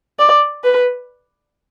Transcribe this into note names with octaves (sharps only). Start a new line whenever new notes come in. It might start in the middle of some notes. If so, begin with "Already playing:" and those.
D5
B4